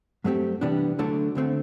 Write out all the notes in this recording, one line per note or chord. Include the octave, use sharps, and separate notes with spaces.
G2 F#3 A3 C4 G4
C3 E3 G3 B3 D4
D2 D3 F#3 A3 D4
D2 D3 A3 C4